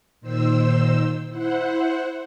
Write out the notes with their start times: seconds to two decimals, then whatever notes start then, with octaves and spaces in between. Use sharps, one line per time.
0.21 A#2 D#3 C5 E6
1.30 E4 C5 F#5